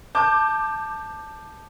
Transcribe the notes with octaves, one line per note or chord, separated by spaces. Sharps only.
A5 D6 G6